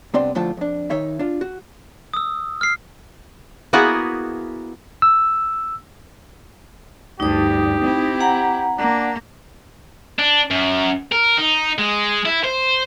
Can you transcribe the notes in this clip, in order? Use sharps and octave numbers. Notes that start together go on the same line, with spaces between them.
C2 B3 C4 D4 D5 C6
A2 D3 F3 F4 G5 A5
F2 D4
D#3 D#4 C#5 E5
D4 F4
F#4
D#6 E6
F6 C7
A#3 B3 E4 F#4 G#4 A#4
E6
D2 G2 D#4 G4 D#6
C4 E4
F#5 A#5
A#3 D4
D4
F#2
A#4
D#4
G#3
E4
C5